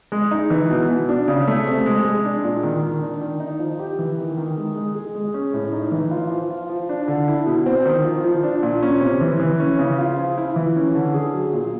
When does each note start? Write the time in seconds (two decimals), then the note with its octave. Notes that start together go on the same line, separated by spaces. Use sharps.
0.12 G#3
0.31 D#4
0.50 E3
0.70 B2
0.90 B2
1.09 D4
1.28 C#3
1.47 A3
1.67 C3
1.86 G#3
2.05 G#3
2.25 D4
2.44 A#2
2.63 D#3
2.82 D#3
3.02 D4
3.21 D#3
3.40 D#4
3.59 F3
3.79 G4
3.99 E3
4.18 D#3
4.37 D#3
4.57 G#3
4.76 G#3
4.95 G#4
5.15 G#3
5.34 C#4
5.53 A2
5.73 D#4
5.92 E3
6.11 F4
6.31 F3
6.50 F4
6.70 F3
6.89 D4
7.08 D3
7.28 E4
7.46 B2
7.66 C4
7.85 D#3
8.04 F3
8.24 F3
8.43 D4
8.63 A#2
8.82 C#4
9.01 C3
9.21 E3
9.40 E3
9.59 C#4
9.79 C#3
9.98 F4
10.17 F3
10.37 E4
10.56 E3
10.76 C#4
10.95 D3
11.14 G#4
11.34 F#3
11.53 A#2